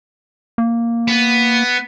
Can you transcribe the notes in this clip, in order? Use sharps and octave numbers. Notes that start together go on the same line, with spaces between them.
A#3
B3